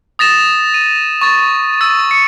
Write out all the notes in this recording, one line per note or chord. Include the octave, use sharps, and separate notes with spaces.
D#6 A6 A#6 E7
D#7
C#6 A6
E6 A6
C#7